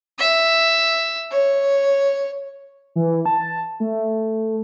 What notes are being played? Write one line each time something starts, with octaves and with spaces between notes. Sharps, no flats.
E5
C#5
E3
A5
A3